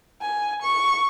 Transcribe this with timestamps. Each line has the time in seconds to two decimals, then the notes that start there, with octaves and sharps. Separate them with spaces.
0.21 G#5
0.62 C#6